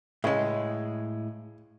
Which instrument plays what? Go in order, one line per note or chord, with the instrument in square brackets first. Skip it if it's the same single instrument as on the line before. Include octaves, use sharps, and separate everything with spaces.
[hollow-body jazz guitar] A2 G#3 [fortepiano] C#3